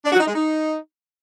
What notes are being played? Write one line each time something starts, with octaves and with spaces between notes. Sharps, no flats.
D4
F#4
D#4
G#3
D#4